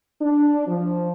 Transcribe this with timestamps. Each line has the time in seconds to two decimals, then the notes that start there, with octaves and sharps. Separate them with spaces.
0.20 D4
0.67 F3